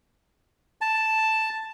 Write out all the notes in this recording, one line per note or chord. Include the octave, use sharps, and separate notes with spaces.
A5